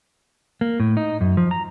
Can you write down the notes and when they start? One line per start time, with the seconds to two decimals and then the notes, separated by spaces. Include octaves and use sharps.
0.61 A#3
0.80 A2
0.97 D#4
1.21 F#2
1.37 F3
1.51 A#5